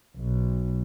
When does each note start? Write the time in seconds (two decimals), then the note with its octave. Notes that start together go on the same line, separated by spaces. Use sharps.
0.15 B1